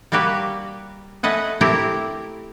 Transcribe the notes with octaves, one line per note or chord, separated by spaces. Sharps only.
G3 A#3 F#4 G4 B4
A3 B4 D#5 F#5 G#5
A3 C4 E4 G4 A#4